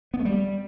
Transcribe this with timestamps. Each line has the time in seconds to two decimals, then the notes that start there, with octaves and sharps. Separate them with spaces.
0.14 B3
0.19 A3
0.25 G3